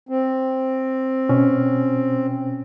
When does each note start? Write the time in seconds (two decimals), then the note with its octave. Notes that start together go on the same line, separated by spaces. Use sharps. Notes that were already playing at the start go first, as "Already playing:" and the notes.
0.09 C4
1.29 B2 C#4